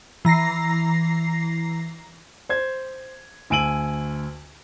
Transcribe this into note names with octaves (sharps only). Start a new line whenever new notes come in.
E3 A#5 A#6 C7
C5 G#6
D2 G#5 E6 D7 D#7 F#7